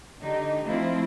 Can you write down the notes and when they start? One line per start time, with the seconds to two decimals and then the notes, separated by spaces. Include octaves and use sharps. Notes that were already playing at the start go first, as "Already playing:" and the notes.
0.20 D3 D#4 G4
0.63 F3 A3 C4 E4 F4